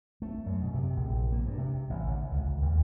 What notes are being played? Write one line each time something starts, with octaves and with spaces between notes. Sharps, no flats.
A3
F#2
B2
C3
A#1
A#3
G2
C3
A1
D3
C#2
D#2